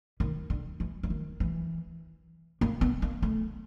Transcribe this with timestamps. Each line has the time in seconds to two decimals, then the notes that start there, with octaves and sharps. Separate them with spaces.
0.20 D#3
0.50 D3
0.80 E3
1.03 E3
1.10 D#3
1.40 E3
2.61 A#3
2.81 B3
3.02 A#3
3.22 A3